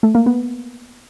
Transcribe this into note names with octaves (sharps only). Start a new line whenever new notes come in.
A3
A#3
B3